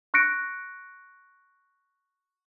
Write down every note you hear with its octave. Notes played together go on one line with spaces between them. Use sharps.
C#6 F#6 A#6 C#7 D7